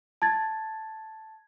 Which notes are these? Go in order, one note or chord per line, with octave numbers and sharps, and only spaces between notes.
A5 G#6 A6